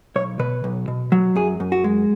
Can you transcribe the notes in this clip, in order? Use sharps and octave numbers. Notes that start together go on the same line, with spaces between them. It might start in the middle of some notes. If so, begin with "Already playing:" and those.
B1 C#5
B2 B4
B1
B2
F#3
F#2 G#4
F#2
F#4
G#3